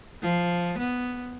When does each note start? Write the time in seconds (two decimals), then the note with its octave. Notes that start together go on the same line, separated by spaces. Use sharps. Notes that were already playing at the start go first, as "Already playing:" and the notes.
0.22 F3
0.78 B3